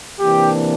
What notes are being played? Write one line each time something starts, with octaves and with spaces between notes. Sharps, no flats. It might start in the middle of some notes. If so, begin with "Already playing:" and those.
C3 E3 A#3 D4 G4